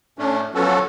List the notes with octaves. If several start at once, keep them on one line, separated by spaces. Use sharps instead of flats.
A2 A3 C#4 D4
F3 F#3 B3 C#4 F#4 A4